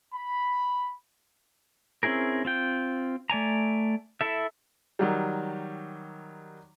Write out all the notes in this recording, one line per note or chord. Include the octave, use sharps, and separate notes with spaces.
B5
C4 C#4 E4 G#4 A#4
C4 F4 G5
A3 D5 G#5 A#5
E4 A4 E5
D#3 F#3 G3